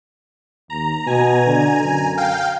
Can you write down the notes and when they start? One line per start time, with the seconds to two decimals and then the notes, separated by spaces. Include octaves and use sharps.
0.70 D#2 A#5
1.07 B2 G#5 A#5
1.47 D3
1.83 F#2
2.17 F5 G5